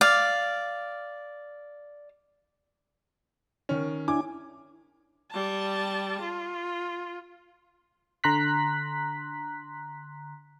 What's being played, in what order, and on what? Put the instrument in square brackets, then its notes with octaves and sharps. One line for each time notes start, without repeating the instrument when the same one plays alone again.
[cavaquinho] D5 F5
[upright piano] D#3 C#4
[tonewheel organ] D4 E4 G#5 [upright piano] D6
[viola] G3 A5
F4
[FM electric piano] D3 A#5 C6 F#6 B6